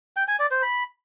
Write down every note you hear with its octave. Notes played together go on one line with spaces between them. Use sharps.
G5
G#5
D5
C5
B5